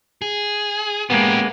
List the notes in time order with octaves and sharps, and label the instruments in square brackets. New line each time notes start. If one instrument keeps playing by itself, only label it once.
[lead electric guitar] G#4
[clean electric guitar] G#3 A#3 B3 [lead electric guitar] C#4 G4